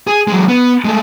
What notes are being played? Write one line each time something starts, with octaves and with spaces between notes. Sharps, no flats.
G#4
F#3 G#3
B3
G#3 A3